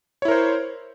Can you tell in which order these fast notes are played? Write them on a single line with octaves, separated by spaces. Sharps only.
C#5 E4 A#4 C5